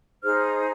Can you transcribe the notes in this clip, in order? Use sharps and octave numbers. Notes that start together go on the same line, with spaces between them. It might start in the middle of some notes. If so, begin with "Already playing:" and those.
D#4 G#4 C5 F6